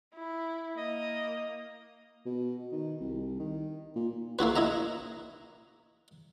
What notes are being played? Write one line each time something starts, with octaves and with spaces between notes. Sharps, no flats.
E4
A#3 D#5
B2
D#3
C2
D#3
A#2
A#3 E4 F#4 B4
E4 D#5 E5 A#5